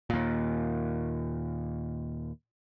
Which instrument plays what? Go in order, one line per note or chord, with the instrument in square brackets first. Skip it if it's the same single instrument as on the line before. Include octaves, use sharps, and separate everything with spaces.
[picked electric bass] D#2 A#2